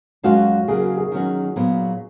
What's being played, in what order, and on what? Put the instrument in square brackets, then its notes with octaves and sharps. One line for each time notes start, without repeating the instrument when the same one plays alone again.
[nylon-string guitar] F#2 F3 G#3 C#4 F4 [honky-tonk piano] F#4
[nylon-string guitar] C#3 F#3 A#3 [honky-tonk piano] G#4
[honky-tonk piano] F#4
G#4
[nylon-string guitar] D#3 F#3 C#4 F#4
A#2 F#3 B3